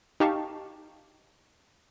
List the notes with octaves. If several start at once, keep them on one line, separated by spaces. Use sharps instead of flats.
D#4 G4 F5 A5 C#6